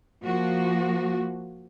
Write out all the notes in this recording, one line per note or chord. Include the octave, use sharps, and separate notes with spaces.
F3 A#3 F#4